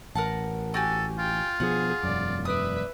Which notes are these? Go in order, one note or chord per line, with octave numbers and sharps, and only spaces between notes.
A1 A#4 F#5 A5
F#4 G4 A4 G#5
F4 G5
B2 F3 G#4 F#5
E1 F#2 D5
B4 D5 E5 D#6